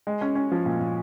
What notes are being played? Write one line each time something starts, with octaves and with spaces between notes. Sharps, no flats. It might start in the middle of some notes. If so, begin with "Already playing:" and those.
G#3
C#4
C#4
F3
A#2
A#2